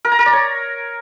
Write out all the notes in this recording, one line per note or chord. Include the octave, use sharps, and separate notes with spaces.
A#4
A#5
A#4
D5
C#5